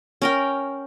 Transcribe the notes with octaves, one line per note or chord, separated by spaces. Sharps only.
C#4 A#4 G5